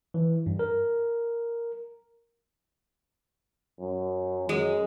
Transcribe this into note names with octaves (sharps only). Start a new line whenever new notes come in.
E3
G2
A#4
F#2
F#2 G#3